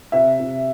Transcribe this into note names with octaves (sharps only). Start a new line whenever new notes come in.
C3 E5
C3